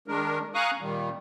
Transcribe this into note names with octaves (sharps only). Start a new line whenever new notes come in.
D#3 G#3 D4 A#4
F5 G#5 A#5 C#6 D#6 F#6
A#2 D#3 G3